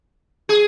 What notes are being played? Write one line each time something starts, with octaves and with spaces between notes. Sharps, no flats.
G#4